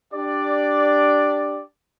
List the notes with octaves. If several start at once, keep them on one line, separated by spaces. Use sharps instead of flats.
D4 G4 D5